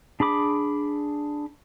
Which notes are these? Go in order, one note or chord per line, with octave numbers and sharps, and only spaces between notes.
D4 G#4 B5 D6